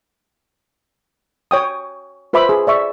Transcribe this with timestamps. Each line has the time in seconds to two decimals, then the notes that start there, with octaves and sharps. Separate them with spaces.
1.51 C#5 G5 D#6
2.33 F4 B4 C5 E5 B5 D6
2.49 G#4
2.67 D5 E5 C#6